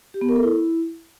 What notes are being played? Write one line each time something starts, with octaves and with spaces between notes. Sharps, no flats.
G4
B3
A#4
A4
E4